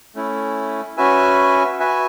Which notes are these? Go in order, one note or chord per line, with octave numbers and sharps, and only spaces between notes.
A3 C#4 E4
C#4 F#4 B4 E5 G#5
F#4 B4 E5 G#5